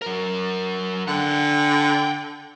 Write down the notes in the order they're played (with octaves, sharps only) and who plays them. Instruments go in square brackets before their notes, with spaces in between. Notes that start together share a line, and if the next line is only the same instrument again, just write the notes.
[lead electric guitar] F#3 A#4
[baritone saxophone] D3 [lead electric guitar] F#5 G5